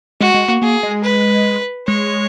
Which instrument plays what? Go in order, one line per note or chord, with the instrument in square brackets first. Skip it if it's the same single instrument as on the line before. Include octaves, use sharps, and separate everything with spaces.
[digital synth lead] G#3 [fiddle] F#4
[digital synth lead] G#3
A#3
[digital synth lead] A#3 [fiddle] G#4
[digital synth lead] G#3
[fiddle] B4
[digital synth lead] G#3 [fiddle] C#5